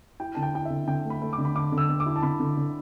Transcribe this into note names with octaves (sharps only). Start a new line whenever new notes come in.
E4 G5
D3 A5
G5
E4 G5
D3 E5
D3 G5
A3
B5
A3
D6
D3
B5
D3 D6
D3
E6
D3
D6
E4
A5
D3 B5
D3
D3